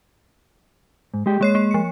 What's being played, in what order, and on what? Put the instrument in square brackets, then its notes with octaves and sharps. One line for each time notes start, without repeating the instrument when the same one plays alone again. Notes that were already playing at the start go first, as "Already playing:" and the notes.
[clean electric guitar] G#2
G#3 G4
[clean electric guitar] G#3 [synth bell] A#3 C#5 C7
[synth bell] A#3
F3 C#7